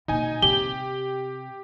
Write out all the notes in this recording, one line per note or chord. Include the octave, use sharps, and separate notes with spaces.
B2 A#3 D#4 G#5
C3 C4 G4 G7